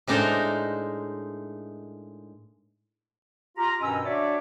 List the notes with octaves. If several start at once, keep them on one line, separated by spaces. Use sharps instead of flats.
A2 G#3 D4 D#4 A#4 C5
F4 G4 A#5
G2 B2 D#3 C#4 D#5 E6
D4 F#4 C#5 D5 E5